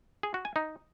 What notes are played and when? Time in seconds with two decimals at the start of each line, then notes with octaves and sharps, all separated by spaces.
0.23 G#4
0.34 F#4
0.45 G#5
0.56 D#4